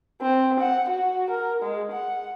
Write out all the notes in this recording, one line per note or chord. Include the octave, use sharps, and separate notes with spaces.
C4
F#5
F#4
A#4
G#3
F#5